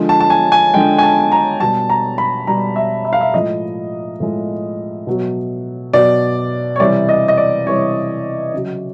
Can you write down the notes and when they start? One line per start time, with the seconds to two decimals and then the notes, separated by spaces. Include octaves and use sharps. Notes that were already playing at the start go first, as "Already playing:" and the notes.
Already playing: D3 F3 G#3
0.09 A5
0.20 A5
0.30 G#5
0.52 G#5
0.74 D3 F3 G#3 G5
0.98 G#5
1.03 A5
1.32 A#5
1.60 B2 G3 A5
1.90 A#5
2.18 B5
2.47 B2 G3 A#5
2.76 E5
3.05 E5
3.13 F5
3.21 E5
3.33 A2 F3 G#3 D#5
4.20 A2 F3 G#3
5.07 B2 F#3
5.93 B2 F#3 D5
6.76 C#5
6.80 C3 E3 G3 D5
7.09 D#5
7.28 D#5
7.38 D5
7.66 C3 E3 G3 C#5
8.53 C#3 F#3